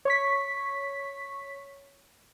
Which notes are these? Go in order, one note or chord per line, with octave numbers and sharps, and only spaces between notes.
C#5 C#6 B6